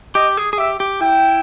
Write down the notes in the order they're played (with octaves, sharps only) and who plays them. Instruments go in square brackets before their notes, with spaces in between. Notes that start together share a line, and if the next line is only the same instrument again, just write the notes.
[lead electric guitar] G4 [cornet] D#5
[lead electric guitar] G#4
G#4
[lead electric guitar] G4 [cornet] E5
[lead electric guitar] G4
[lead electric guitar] E4 [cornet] G5